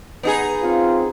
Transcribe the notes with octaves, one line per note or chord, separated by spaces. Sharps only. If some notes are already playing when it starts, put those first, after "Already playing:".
B3 D#4 G#4
C4 F4